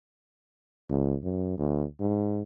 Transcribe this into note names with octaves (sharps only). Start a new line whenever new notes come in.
C#2
F#2
D2
G#2